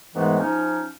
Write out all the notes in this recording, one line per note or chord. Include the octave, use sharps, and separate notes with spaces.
G#2 D#3 E3 G#3 A3 B3
F3 C#4 D#4